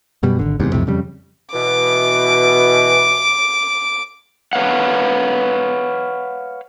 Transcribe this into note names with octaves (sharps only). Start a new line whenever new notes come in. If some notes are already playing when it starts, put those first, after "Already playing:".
F#2 B2 G3
G#1 D3
F#1 E2 G#2 C3
B1 F2 A2 C3
F2 C#3 G3
B2 E3 D6
B4 C#5 F5 F#5